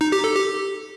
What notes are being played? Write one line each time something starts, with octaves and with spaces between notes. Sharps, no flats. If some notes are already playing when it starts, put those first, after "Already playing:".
D#4
G4
A4
G4